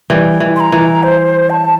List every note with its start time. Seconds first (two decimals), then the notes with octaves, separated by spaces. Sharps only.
0.10 E3 G3
0.40 E3
0.56 C6
0.60 A#5
0.72 E3
1.03 C5
1.50 A5